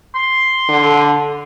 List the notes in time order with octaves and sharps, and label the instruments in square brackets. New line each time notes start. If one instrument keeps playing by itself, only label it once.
[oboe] C6
[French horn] D3